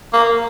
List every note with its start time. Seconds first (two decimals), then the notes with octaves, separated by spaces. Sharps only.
0.13 A#3